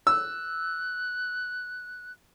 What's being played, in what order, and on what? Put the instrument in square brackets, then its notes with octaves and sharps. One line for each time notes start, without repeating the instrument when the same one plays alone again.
[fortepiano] E6 [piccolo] F#6